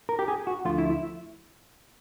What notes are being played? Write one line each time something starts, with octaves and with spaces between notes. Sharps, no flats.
A#4
G4
G#4
F#4
D2 D3 F3 A3 F4
E4
E4